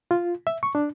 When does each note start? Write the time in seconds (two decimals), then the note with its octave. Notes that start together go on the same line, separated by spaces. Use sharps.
0.11 F4
0.47 E5
0.63 C#6
0.75 D4